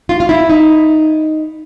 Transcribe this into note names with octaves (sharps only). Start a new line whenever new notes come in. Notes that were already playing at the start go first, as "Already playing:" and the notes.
F4
F4
E4
D#4